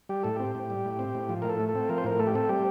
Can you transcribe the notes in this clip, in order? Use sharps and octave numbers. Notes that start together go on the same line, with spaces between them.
G3 G4
A2 A4
C4 G4
A2
G3
A2
C4
A2
F3
A2 A#4
A4
A3
A4
C4
F3 A#4
C5
A2 A#4
A3 A4
G4
C4 A4
G3 G4